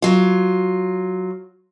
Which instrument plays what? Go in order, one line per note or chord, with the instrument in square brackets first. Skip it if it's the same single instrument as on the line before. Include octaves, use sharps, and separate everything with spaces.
[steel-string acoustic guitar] F#3 F4